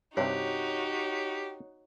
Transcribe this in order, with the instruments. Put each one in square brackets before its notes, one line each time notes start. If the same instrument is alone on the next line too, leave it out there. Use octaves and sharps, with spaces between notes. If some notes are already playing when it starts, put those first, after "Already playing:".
[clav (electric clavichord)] G2 C3 [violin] D#4 F#4 [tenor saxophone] G4 [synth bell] C#5